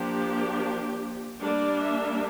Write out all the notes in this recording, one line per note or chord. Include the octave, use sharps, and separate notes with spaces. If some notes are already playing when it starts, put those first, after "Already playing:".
Already playing: F3 A#3 D4 G4
G3 A#3 D4 D5
E5